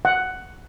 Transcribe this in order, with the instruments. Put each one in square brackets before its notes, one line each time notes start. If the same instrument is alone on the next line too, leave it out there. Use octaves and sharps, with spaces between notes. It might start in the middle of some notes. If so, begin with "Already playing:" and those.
[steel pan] F#5